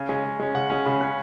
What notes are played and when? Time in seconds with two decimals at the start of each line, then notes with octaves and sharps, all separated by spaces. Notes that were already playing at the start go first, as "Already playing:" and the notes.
Already playing: C#3 G#5
0.09 G#3 C#4
0.24 C#3
0.40 G#3 C#4
0.55 C#3 F#5
0.70 G#3 C#4
0.85 C#3 B5
1.01 G#3 C#4 F#6